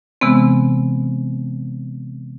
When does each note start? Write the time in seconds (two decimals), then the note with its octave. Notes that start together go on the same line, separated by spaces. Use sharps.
0.21 C3 E3 G#3 B3 C4